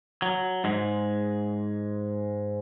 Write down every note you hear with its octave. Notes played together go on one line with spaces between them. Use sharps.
F#3
G#2 G#3